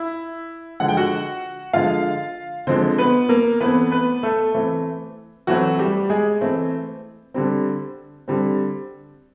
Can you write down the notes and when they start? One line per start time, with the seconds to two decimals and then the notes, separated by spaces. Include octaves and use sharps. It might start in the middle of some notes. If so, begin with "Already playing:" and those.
Already playing: E4 E5
0.80 D3 F3 G#3 F#5
0.88 G5
0.97 F#4 F#5
1.73 D3 F3 G#3 F4 F5
2.67 D3 F3 G#3 C4 C5
2.98 B3 B4
3.29 A#3 A#4
3.60 E3 A3 B3 C4 B4
3.91 B3 B4
4.23 A3 A4
4.54 E3 A3 C4
5.47 E3 F#3 A3 C4 F#4
5.79 G3 G4
6.10 G#3 G#4
6.41 E3 A3 C4
7.34 D3 G3 C4
8.28 D3 G3 C4